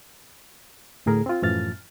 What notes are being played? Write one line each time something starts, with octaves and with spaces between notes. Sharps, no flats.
D2 A2 G#4 A#4
C4 F4
F#2 A2 E3 F3 F6 A6